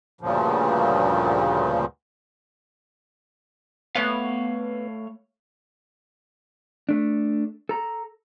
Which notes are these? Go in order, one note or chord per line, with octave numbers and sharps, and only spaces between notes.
D2 G2 A#2 C#3 F3
A3 B3 C#5 F5
A3 D4
A4 A#5